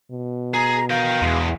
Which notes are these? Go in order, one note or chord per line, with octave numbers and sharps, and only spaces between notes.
B2
G#4 A#5
A#4 F5 G5
E2 E3 G#3